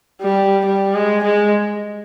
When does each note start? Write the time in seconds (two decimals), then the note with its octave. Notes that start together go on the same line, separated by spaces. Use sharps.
0.22 G3
0.66 G3
0.95 G#3
1.24 G#3